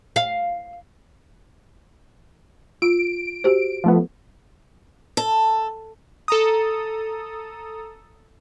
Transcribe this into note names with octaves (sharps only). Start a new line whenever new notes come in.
F5
F4 D7
F#4 G4 C5
F3 A3 B3
A4
A4 A#5 D#6